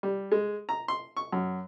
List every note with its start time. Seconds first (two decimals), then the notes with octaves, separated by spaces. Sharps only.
0.03 G3
0.32 G#3
0.69 A#5
0.88 C6
1.17 C#6
1.33 F#2